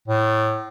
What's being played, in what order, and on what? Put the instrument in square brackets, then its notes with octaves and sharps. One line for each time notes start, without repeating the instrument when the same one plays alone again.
[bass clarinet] A2